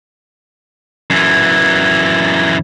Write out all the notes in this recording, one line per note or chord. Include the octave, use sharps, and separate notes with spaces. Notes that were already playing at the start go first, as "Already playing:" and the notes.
F#2 E3